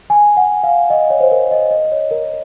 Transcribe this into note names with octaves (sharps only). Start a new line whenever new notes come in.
G#5
F#5
F5
D#5
C#5
C5
A#4
D#5
D#5
C#5
A#4